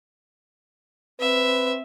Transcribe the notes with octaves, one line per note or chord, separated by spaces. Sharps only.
C4 B4 E5